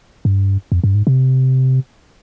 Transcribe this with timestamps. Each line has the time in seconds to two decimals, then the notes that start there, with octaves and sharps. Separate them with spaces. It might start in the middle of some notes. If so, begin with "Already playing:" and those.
0.25 G2
0.72 F2
0.84 G2
0.95 G#2
1.07 C3